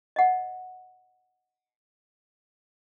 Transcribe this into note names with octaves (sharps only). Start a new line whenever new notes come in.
D#5 F#5